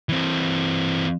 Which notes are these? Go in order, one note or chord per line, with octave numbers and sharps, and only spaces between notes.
E3 C4